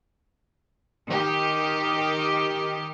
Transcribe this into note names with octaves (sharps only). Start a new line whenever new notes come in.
D#3 G4